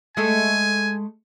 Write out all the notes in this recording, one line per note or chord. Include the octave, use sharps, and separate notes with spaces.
G#3 A3 A4 G#5